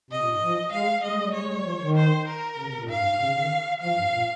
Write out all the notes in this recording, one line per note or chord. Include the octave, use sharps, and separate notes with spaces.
C3 D#5
A#2
G#2
F3
G#3 F5
G#3 D#5
G#3
G3
G#3 C#5
G#3
G3
F3
D#3
C5
A#4
C#3
C3
A#2
G#2 F5
G2
G#2
C#3
C#3
D#3
F3 F5
G2
A#2